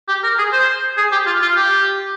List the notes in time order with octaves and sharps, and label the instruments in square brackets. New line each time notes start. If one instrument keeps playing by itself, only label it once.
[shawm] G4
A#4
G#4
C5
G#4
G4
F4
F4
G4